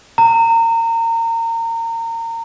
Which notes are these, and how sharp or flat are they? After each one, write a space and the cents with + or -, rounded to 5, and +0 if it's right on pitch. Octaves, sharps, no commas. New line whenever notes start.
A#5 -30